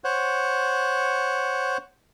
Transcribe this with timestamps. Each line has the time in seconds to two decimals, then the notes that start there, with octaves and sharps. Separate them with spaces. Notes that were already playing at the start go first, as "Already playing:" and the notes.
0.04 C5 C#5 F#5